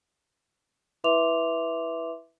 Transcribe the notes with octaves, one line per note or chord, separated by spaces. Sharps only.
E4 B4 E5 C6 D6 F7